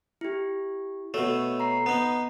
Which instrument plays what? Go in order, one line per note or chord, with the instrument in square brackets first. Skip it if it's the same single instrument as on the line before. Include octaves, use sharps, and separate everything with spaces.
[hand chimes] E4 G4
[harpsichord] B2 A3 [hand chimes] F#4 C#5 E6
[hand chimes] A#5 C7
[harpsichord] B3 D#4